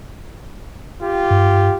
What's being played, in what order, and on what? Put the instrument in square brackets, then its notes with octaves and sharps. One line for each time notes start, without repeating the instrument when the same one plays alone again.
[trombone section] F4 G4
[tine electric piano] G2